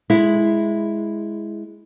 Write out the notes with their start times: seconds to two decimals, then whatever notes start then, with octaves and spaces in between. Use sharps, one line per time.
0.10 G#3 E4